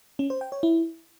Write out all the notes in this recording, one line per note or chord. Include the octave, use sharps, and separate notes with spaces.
C#4
C5
G5
C#5
E4